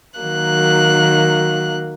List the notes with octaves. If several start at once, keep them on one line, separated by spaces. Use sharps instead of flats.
D#3 F#3 A#3 F#6